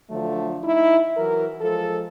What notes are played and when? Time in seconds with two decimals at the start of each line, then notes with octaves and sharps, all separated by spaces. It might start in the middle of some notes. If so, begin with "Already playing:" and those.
0.10 D3 F3 F#3 A3
0.64 D#4 E4
1.17 E3 F#3 A#4
1.61 F3 G#3 A4